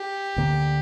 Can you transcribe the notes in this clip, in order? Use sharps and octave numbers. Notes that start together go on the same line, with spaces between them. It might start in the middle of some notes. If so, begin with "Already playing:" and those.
Already playing: G4
D2 D3 A#3